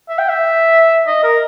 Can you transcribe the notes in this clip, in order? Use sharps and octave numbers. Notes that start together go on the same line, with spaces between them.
E5
G5
E5
D#5
A#4